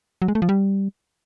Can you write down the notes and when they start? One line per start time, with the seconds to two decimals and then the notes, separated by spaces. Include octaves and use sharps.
0.22 F#3
0.28 G#3
0.35 A3
0.42 F3
0.49 G3